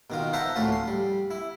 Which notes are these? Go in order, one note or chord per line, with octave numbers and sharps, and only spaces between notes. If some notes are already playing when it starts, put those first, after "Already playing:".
B2 D#3 F4
C5 E5 F#5 A5 A#5
D2 A2 A3 C#4 F4 A5
C6
G3
E4